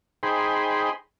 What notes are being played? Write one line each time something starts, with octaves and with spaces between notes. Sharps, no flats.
D#4 G#4 C5 G5 B5 C6